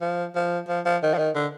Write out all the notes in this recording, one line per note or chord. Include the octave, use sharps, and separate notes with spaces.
F3
F3
F3
F3
D#3
F3
D#3
D3